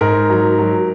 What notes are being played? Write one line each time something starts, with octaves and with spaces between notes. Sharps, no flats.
G#2 A#4
F#3
F#3